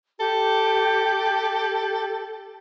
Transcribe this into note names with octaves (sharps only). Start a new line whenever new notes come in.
G4 A4